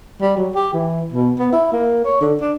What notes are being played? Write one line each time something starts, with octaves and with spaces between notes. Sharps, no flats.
G3
F#3
G4
E3
B2
B3
E4
A#3
C#5
D3
D4